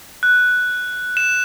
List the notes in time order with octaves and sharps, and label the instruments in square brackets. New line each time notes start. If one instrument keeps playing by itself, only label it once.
[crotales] F#6
E7